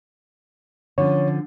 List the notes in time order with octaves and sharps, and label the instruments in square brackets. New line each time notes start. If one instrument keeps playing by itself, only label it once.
[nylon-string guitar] D3 F3 C#4 [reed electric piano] C#5